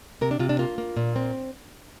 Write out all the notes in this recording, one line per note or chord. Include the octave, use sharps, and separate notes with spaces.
C3 A#4
D4
C3 F4
D4
A#3 F4
A#3
A#2
C4